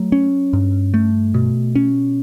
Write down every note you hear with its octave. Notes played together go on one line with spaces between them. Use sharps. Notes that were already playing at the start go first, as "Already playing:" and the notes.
Already playing: F#3 A3
C#4
G2
A3
B2
C#4